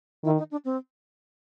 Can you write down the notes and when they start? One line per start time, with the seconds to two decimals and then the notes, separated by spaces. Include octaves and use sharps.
0.24 D#3 E4
0.38 D#4
0.51 D4
0.65 C4